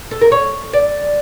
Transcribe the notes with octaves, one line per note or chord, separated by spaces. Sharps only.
A4
A#4
C#5
D5